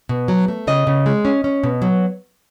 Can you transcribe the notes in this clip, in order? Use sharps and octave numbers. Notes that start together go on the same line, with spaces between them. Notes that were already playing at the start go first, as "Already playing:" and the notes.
B2
F#3
A3
C#3 D#5
C#3
G#3
C#4
C#4
B2
F#3